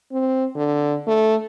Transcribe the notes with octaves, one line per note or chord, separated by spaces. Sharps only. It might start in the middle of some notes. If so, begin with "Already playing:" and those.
C4
D3
A3